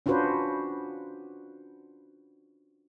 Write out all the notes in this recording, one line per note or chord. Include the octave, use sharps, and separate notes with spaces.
C#4 D4 F4 F#4 B4 C5